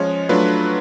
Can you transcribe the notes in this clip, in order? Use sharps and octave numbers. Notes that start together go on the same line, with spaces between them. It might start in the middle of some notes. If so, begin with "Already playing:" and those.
Already playing: F3 G#3 C#4 F4 C#5
F#3 A3 D4 F4 B4